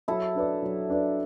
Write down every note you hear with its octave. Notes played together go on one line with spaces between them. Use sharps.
F#3 E4 A4
D4 B4 D5
F#3
D4 B4 D5